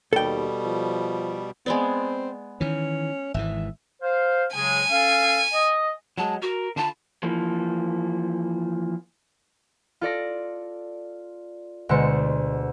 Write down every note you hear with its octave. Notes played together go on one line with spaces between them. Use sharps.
D#2 B2 G3 A4 G5
F3
G#3 B3 C4 D5
D#3 E3 C#4
G#1 G#2 E3 E5
C5 F5
C#3 F#3 G#3 G#5
C#4 A4 F5
D#5
F#3 G#3 A5
F#4 A#4
D3 F4 A5 B5
E3 F3 A#3
F4 A4 D5 A#6
D2 B2 D3 G#3 C5 C#7